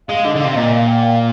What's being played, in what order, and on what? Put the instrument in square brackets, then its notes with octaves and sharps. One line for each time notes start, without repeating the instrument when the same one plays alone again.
[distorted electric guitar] G#3 [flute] F5
[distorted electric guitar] D3 [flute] D#5
[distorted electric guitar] D3 [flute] F5
[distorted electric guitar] C3
[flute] F5
[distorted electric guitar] A#2 [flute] D#5
[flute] F5
G5
F5